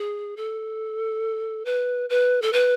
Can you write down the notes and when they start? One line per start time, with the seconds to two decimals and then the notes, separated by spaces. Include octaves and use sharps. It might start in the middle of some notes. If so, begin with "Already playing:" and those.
Already playing: G#4
0.37 A4
1.65 B4
2.10 B4
2.42 A4
2.53 B4